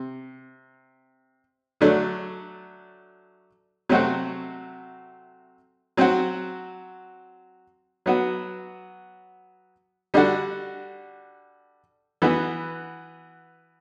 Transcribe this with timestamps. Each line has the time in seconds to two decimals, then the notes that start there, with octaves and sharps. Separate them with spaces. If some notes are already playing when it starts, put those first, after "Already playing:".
Already playing: C3
1.81 D3 F#3 A3 D4
3.89 C3 F#3 A3 C4 F#4
5.97 F#3 C4 F#4
8.06 F#3 B3 F#4
10.14 D3 G3 D4 F#4
12.22 E3 B3 F#4